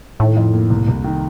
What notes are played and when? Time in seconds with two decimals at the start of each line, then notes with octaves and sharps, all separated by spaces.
0.19 A2 D#3
0.37 F2
0.53 A#3
0.70 C2
0.88 C2
1.04 D#3